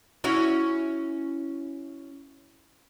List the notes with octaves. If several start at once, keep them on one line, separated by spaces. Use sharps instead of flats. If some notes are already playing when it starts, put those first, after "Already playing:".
C#4 E4 F#4